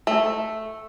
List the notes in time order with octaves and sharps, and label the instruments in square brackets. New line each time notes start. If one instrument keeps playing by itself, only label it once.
[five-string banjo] A3